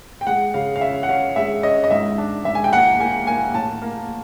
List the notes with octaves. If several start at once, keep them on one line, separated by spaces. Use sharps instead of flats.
G5
G#3 F#5
C#3 F5
F5
C#4 E5
F#5
C#4 F5
G#3 E5
C#4 D#5
D#5
G#2 E5
D4
G#2 E5
G#5
G5
A#3 F#5
A#3 G#5
A#3 G#5
A2 A5
A#3